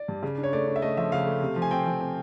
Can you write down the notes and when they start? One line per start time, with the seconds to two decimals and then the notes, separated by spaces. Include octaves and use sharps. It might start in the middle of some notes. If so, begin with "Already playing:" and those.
Already playing: D5
0.08 G2
0.23 C#3
0.38 D4
0.43 C#5
0.52 A3 D5
0.68 D4
0.76 E5
0.82 A3 D#5
0.97 F3 E5
1.12 C#3 F5
1.27 A3
1.42 C3
1.56 F3
1.62 G#5
1.71 C4 G5
1.87 F3
2.01 C4